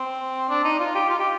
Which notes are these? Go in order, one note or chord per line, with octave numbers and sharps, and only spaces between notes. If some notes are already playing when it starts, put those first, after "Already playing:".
Already playing: C4
D4
D#4
F4
G4
F4
G4